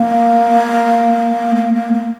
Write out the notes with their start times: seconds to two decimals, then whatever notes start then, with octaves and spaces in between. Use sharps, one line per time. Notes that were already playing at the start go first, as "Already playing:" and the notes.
Already playing: A#3
1.56 A#3
1.74 A#3
1.94 A#3